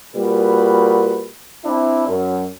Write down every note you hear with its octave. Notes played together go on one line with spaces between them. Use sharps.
A#2 G3 F#4 B4
C4 D4 E4
F#2